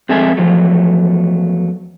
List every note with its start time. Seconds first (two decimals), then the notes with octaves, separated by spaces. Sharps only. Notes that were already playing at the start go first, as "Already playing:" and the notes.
0.09 F2 G#3 C4 A4 E5 G#5
0.37 E2 G2 F3 F#3 A3